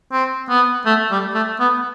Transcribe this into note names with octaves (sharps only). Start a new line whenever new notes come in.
C4
B3
A3
G3
A3
B3